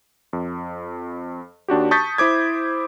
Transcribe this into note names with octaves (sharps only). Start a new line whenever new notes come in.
F2
D#2 D4 F#4 G4
A5 C#6 D#6 G6 A6 B6
E4 C5 D6 G#6